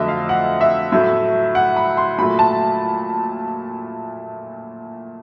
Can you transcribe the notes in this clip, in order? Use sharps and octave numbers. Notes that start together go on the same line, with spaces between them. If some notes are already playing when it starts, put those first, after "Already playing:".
Already playing: F2 D3 F#3 A3 D#5 E5
F5
F#5
E5
A2 F#3 A3
F#5
B5
C6
A#2 F#3 A3 B5
A5